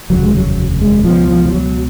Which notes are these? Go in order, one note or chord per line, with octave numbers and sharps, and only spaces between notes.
F1 D#2 C#3 F#3
G#3
F#3
G#3
C#2 B2 F3
F3
F3
F#3